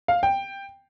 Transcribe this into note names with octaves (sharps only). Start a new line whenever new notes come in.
F5
G5